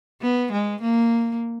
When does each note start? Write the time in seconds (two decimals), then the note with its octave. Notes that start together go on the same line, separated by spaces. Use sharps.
0.22 B3
0.52 G#3
0.81 A#3